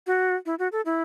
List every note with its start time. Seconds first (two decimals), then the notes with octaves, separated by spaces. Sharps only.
0.07 F#4
0.46 E4
0.59 F#4
0.72 A4
0.85 E4